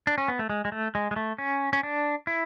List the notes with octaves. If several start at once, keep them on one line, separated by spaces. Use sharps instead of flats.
D4
C#4
B3
A3
G#3
G#3
A3
G#3
G#3
A3
C#4
C#4
D4
E4